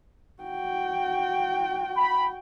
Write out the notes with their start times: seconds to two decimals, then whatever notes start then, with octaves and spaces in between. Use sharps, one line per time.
0.43 F#4 G5
1.97 B5